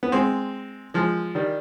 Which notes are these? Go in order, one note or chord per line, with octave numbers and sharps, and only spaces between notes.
B3
G#3 C4
F3 G#3
D#3 G3